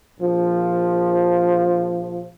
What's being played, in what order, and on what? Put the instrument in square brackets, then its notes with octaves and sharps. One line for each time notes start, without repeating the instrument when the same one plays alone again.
[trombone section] A#1 F3